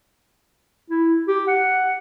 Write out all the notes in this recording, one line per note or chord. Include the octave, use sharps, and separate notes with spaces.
E4
G4
F#5